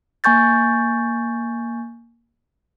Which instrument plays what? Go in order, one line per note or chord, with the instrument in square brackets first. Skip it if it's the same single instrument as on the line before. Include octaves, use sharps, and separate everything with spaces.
[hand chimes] A#3 G#5 C#6 G6 A6